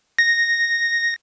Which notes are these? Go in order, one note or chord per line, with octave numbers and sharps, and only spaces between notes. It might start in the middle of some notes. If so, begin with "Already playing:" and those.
A#6